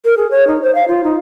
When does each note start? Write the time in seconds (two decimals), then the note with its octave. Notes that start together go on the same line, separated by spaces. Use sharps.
0.05 A#4
0.17 G#4
0.31 C#5
0.47 D#4
0.62 C5
0.75 F5
0.88 F4
1.04 D#4